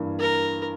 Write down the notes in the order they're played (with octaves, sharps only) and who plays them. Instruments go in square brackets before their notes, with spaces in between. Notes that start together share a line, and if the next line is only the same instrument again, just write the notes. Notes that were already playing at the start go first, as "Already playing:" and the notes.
Already playing: [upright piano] G2 E3 A#3
[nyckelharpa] A#4